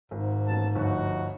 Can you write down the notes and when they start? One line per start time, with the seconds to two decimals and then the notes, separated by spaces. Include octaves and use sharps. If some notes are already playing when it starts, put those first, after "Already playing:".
0.11 G#1 G#2
0.47 A1 B2 A5
0.75 G1 D2 F3 D#4 F#4